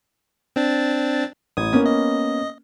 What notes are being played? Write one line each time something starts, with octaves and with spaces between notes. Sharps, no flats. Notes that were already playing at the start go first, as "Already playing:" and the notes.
C4 D4 A6
A1 D#6 G#6
A#3 B3 C#4
D#5